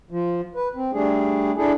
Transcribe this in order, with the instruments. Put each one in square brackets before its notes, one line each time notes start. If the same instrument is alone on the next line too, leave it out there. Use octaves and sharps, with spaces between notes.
[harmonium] F3
B4
C4
G3 A3 D4 G#4
D4 E4 G#4 A4